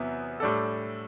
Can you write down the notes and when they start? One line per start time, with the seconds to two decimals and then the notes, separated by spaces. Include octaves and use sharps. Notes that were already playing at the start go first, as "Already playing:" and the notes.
Already playing: E2 C3 F#3 B3 E4
0.40 A2 G3 D4 A4